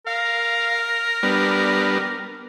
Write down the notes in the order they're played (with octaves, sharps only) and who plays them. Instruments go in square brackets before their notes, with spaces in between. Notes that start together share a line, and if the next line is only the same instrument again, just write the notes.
[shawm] A#4 [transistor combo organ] F5
[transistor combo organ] G3 B3 D4